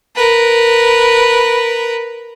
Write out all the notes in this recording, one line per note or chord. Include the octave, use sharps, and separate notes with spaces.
A#4 B4